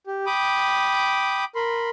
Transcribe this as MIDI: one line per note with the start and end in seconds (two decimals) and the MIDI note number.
0.07 0.25 67
0.26 1.44 79
0.26 1.44 83
0.26 1.44 86
0.26 1.44 87
1.55 1.90 70
1.55 1.90 83
1.55 1.90 84